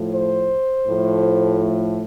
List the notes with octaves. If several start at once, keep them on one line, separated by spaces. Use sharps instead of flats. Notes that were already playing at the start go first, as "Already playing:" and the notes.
Already playing: A2 F3 A3
C5
A2 F3 A3